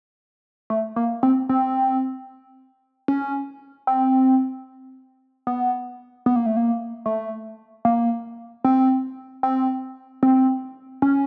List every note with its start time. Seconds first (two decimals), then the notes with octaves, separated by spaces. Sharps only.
0.70 A3
0.96 A#3
1.23 C4
1.49 C4
3.08 C#4
3.87 C4
5.47 B3
6.26 B3
6.36 A#3
6.46 A3
6.57 A#3
7.06 A3
7.85 A#3
8.65 C4
9.43 C4
10.23 C4
11.02 C#4